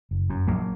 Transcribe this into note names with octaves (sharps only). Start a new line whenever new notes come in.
F#1
F#2
A#1 F#3 A#3